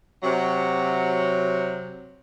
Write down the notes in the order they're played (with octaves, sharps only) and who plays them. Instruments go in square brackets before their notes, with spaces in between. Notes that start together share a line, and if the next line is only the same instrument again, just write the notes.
[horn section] C3 F#3